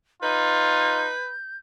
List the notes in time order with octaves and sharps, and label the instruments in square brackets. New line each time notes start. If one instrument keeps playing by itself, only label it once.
[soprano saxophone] D#4 [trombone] F4 [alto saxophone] B4 [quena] G6